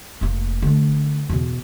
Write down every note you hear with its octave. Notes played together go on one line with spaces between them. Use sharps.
F1 A#3
D3 A3
E2 B2